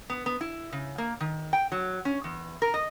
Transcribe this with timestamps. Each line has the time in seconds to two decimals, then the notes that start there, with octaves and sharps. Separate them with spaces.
0.10 B3
0.26 B3
0.41 E4
0.73 C#3
0.98 A#3
1.20 D#3
1.53 G5
1.72 F#3
2.05 C#4
2.24 E2
2.62 A#4
2.74 D#5